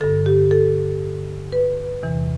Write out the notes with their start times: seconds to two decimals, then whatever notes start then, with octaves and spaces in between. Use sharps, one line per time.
0.01 G2 D3 A4
0.26 G4
0.51 A4
1.52 B4
2.03 E2 C3 E3